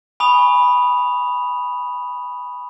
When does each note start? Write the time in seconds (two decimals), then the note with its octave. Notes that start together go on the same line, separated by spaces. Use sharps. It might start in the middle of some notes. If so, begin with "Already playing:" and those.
0.20 G#5 B5 C#6 D#6 F7